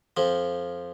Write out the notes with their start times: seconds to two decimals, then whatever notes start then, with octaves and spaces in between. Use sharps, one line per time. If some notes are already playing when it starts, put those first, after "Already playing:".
0.17 F2 F3